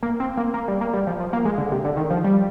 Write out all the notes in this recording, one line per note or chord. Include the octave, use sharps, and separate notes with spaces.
A#3
C4
A#3
A#3
G3
A#3
G3
F3
F3
A#3
G#3
D3
C3
D3
D#3
F3
G3